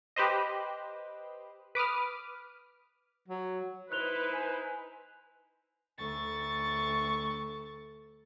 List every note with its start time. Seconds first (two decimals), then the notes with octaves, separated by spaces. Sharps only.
0.16 G4 B4 C5 D#5
1.75 B4 D6 D#6 F6
3.28 F#3
3.92 D#4 E4 B4 C5 F#6 F7 G7
4.33 G#5
5.99 D2 A4 C#6 A6